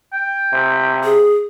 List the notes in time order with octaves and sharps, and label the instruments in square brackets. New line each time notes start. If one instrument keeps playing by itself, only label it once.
[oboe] G5
[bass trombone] C3
[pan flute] G#4